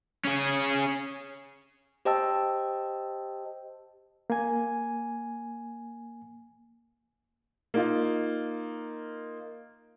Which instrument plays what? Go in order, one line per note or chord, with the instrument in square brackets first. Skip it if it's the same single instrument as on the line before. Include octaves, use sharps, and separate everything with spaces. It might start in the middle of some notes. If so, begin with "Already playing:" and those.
[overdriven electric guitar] C#4 G#4
[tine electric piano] G4 C5 D#5 G5 A5 E6
[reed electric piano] A#3 G#5
[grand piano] A#3 D#4 F4